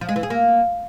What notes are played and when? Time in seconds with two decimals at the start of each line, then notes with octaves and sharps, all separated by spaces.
0.01 F3
0.09 G#3
0.16 E3
0.23 G#4
0.30 A#3